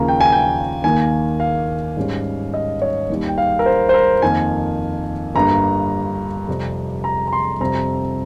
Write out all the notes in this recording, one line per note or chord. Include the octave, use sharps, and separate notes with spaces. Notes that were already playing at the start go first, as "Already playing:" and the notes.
Already playing: D#2 C#3 F3 A#3 A#5
G5
G#5
G5
D#2 D#3 A#3 G#5
F5
G#2 G3 C#4
D#5
C#5
D#2 D#3 G3
G5
F5
A#4
C5
C5
A#4
F2 D#3 A#3 G#5
G1 G2 G3 A#3 A#5
F2 C3 G3
A#5
A#5
C6
F2 C3 G3 C4 A#5